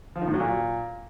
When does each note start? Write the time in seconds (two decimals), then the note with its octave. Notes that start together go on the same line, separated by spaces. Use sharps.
0.16 F3
0.22 D#3
0.28 A2
0.34 F#3
0.40 A#2